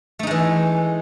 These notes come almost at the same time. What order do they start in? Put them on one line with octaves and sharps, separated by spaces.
A3 D#4 G#3 E3